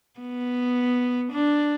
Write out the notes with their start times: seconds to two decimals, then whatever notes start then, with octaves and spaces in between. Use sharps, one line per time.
0.20 B3
1.32 D4